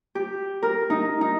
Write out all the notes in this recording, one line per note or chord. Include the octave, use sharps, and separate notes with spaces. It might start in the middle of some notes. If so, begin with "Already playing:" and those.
G4
A#4
D#4
D#4